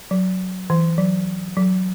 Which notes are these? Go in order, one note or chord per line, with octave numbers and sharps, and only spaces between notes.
F#3
E3
F#3
F#3